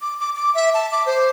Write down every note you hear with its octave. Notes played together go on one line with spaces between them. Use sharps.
D6
D6
D6
E5
A5
D6
C5